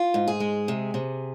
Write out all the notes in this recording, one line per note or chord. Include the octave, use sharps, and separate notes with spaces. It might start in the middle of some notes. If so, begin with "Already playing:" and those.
Already playing: F4
G#2
G#4
G#3
C3
C3